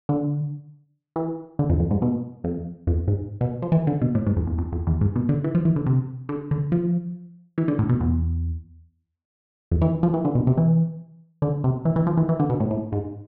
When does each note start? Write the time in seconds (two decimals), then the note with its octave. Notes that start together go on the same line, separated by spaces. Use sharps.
0.09 D3
1.16 E3
1.59 D3
1.70 F2
1.80 F2
1.91 G#2
2.02 B2
2.44 F2
2.87 F2
3.08 G#2
3.41 B2
3.62 F3
3.72 E3
3.87 D3
4.02 B2
4.15 A2
4.27 G#2
4.36 F2
4.47 E2
4.58 F2
4.72 F2
4.87 E2
5.01 G#2
5.16 B2
5.29 D3
5.44 E3
5.55 F3
5.65 E3
5.76 D3
5.86 C3
6.29 D3
6.51 D3
6.72 F3
7.58 E3
7.68 D3
7.79 A2
7.89 B2
8.00 E2
9.71 F2
9.82 E3
10.03 F3
10.14 E3
10.25 D3
10.35 B2
10.47 C3
10.58 E3
11.42 D3
11.64 C3
11.85 E3
11.96 E3
12.07 F3
12.17 E3
12.29 E3
12.40 D3
12.50 B2
12.60 A2
12.71 A2
12.92 G#2